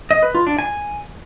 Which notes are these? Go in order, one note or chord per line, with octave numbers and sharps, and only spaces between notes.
D#5
B4
F4
D4
G#5